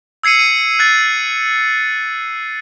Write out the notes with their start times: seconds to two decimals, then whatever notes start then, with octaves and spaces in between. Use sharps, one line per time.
0.24 E6 G#6 C7 C#7 D#7
0.39 D#7
0.79 F#6 G#6 A6 D#7